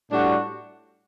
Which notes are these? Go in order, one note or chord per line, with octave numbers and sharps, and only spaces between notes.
A2 G3 D4 F#4